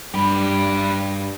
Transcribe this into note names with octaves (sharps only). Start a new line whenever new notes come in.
G2 G4 B4